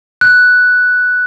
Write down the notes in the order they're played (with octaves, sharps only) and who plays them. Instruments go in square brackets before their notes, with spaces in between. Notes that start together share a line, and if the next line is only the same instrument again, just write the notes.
[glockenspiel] F#6